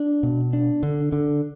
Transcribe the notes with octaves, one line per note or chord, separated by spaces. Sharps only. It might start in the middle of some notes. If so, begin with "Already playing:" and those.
Already playing: D4
B2
D4
D3
D3